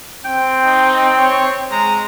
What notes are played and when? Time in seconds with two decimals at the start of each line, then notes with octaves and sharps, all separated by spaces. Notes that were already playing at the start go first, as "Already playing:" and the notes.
0.25 C4 G5
0.65 D#4
1.18 C#5
1.72 G#3 A#5